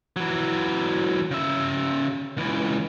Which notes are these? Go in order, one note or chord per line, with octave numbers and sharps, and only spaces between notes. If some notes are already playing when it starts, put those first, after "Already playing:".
E3 F#3
C#3 E5
C#2 E3